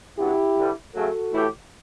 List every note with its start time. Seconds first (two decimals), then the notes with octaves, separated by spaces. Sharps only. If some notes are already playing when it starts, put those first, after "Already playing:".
0.19 C#3 F#3 B3 D4 E4 G4
0.57 G2 D3 G3
0.95 F#2 C#3 F#3 A3 F#4 A4
1.33 A2 E3 A3 E4 G4